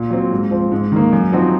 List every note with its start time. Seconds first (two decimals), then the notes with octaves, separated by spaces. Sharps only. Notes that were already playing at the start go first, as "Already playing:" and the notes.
Already playing: A#2
0.10 F#3 C4
0.31 G#2
0.51 F3 C4
0.72 G#2
0.92 D#3 A#3
1.12 F#2
1.32 F3 C4 D#4 F#4